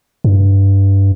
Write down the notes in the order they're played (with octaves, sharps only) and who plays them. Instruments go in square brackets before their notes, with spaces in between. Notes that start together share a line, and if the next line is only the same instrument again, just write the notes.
[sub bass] G2